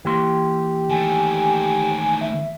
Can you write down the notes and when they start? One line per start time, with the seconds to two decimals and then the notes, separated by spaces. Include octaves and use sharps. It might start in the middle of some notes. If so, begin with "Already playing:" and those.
0.05 E3 A#3 G4 C6
0.90 D#3 A3 G#5
2.21 E5